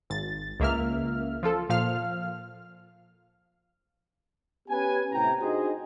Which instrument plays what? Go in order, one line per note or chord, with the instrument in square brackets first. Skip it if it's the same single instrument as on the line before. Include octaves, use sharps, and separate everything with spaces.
[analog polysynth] G#1 A6
C#2 A#3 E5 F6
F3 F4 A4
A#2 F3 F5 F6
[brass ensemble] B3 C#4 G4 B4 G#5
A2 C3 E4 G5 A#5
D4 D#4 F#4 G#4 C5 D#5